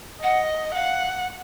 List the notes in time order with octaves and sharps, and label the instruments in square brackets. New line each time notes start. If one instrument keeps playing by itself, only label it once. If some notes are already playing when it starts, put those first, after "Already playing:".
[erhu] D#5 [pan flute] F#5
[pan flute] F5 [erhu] F#5